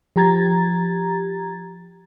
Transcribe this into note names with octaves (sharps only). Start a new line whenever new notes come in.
F3 G4 A#5 G#6 A6